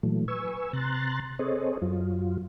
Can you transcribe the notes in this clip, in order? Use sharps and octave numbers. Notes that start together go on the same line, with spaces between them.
A#2 E3 F#3 A3
B4 G#5 C#6 E6
C3 A#5 C6 F#6 A6
C4 G#4 A4 C5 C#5 D#5
F#2 F#3 F4